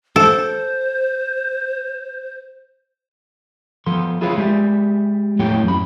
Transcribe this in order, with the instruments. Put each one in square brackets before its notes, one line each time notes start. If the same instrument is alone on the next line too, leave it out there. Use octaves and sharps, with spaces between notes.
[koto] A4 [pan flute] C5
[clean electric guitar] F3 B3 A4 C6
E4 F4 G#4 B4 C#5 F5
G#3 G4 D5 E5
F2 A2 F#3 G4 C#5 G5
F#2 B5